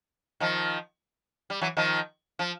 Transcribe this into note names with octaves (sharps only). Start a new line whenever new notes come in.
D#3 F3
G3
E3 F#3
D#3 F3
F3